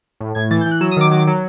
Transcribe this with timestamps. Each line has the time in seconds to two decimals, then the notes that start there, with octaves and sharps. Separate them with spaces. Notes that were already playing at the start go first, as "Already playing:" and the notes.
0.20 A2
0.35 A2 G#6
0.51 E3 A6
0.61 G6
0.66 E3
0.71 F#6
0.81 F#3 E6
0.91 D#6
0.97 D#3 D6
1.11 F#3
1.27 F#3